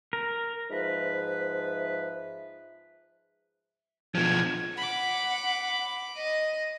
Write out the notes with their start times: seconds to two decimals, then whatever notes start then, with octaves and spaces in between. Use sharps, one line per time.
0.13 A#4
0.70 G#2 F3 B4 E5
4.15 B2 F3 G#6
4.77 F#5 B5 D6
6.17 D#5